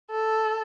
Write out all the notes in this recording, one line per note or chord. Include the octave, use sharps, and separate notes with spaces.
A4